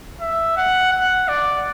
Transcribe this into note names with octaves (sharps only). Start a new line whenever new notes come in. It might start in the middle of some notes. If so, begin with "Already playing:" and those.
E5
F#5
F#5
D5